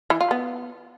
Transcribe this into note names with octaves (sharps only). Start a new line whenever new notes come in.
E3
F4
B3